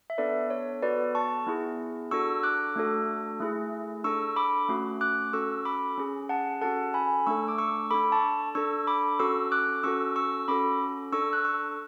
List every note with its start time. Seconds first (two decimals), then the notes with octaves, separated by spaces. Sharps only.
0.10 E5
0.18 B3 D4 A4 B4 D5
0.50 C#5
0.82 B3 F#4 A4 B4 D5
1.15 A5 C#6
1.47 B3 E4 G#4
2.11 D4 F#4 A4 C#6 E6
2.43 D6 F#6
2.76 A3 D4 F#4 A4
3.40 A3 E4 G#4
4.04 D4 A4 C#6 E6
4.36 B5 D6
4.69 A3 C#4 F#4
5.01 D6 F#6
5.33 C#4 F#4 A4 C#6 E6
5.65 B5 D6
5.98 C#4 G#4
6.29 F#5 A5
6.61 C#4 F#4 A4 F#5 A5
6.94 G#5 B5
7.27 A3 D4 A4 C#6 E6
7.48 D6
7.58 C#6 E6
7.91 D4 A4 B5 D6
8.12 A5 C#6
8.55 D4 A4 C#6 E6
8.87 B5 D6
9.19 C#4 F#4 A4 C#6 E6
9.52 D6 F#6
9.83 C#4 F#4 A4 C#6 E6
10.16 C#6 E6
10.48 C#4 F#4 A4 B5 D6
11.12 D4 A4 C#6 E6
11.33 F#6
11.45 C#6 E6